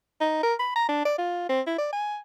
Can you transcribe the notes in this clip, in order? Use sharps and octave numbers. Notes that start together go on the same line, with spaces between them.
D#4
A#4
B5
A#5
D4
D5
F4
C4
E4
D5
G#5